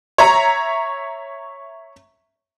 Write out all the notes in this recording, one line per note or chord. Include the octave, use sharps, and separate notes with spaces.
C#5 E5 A#5